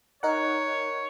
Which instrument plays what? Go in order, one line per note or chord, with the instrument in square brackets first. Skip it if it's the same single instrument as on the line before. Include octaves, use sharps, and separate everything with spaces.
[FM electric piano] D#4 A#4 F#5 [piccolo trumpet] C#5